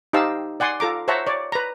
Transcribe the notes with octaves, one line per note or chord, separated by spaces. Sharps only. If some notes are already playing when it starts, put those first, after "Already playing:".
D#4 G4 C5 F5 A5 E6
D5 F#5 G#5 C6
F4 A4 A#5 D6
C5 C#5 E5 F#5 A5 A#5
C#5 D5
B4 A#5